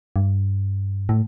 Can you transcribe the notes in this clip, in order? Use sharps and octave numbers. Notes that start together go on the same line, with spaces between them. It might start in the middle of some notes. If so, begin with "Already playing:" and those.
G2
A2